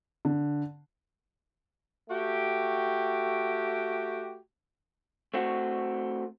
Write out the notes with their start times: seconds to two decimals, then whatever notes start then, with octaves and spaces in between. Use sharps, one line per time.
0.25 D3
2.10 A3 F#4 G4
5.34 A3 C4 F#4